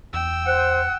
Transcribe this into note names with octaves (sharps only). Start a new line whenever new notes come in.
E2 G5 E6
C5 F#5